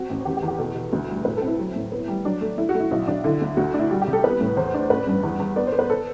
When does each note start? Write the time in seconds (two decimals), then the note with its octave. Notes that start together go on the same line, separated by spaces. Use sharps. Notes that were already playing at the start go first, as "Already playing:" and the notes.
Already playing: C4 F#4
0.10 A1
0.25 E2 G4
0.37 G4
0.43 E2
0.48 G4
0.59 B2 A4
0.75 B2
0.92 D2
1.08 G3
1.25 A2 B4
1.37 C4 A4
1.47 E4
1.59 F#3
1.76 A2
1.92 B3
2.08 G3
2.25 F#3 D4
2.41 A3
2.58 A3 E4
2.69 F#4
2.75 A3
2.80 E4
2.91 B1 E4
3.08 B1 D4
3.24 D3 E4
3.41 D2
3.57 D2 F#4
3.74 D4
3.79 E4
3.91 G3 F#4
4.02 G4
4.07 C2
4.13 A4
4.24 B3 B4
4.41 A2
4.57 E2 C5
4.74 D4
4.90 A1 B4
5.07 G2
5.23 E2
5.40 E2
5.56 B3 D5
5.67 C5
5.73 B3
5.79 B4
5.90 A4